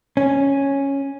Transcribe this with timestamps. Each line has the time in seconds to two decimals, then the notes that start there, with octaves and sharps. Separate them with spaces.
0.17 C#4